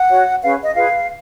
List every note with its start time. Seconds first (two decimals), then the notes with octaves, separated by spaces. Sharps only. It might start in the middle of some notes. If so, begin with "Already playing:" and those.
Already playing: F#5
0.09 F#4 C#5
0.42 C#4 G#4 B4 F5
0.63 D#5
0.74 F4 G#4 B4 F5